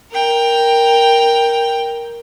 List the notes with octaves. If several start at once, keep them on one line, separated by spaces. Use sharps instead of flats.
A#4 G5